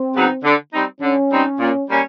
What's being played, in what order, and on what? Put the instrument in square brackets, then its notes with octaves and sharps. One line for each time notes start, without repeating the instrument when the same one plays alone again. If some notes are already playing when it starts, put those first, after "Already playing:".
Already playing: [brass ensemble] C4
[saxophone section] C#3 F#3 B3 D#4
D3
G3 C4 D#4
[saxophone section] D3 [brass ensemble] C#4
[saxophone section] G3 C4 D#4
A#2
G3 A#3 C#4